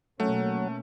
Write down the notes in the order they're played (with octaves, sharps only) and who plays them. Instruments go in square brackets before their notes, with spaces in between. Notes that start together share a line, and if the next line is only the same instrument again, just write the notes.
[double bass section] B2 A#3 C#4 [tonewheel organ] F#3 [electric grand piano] A3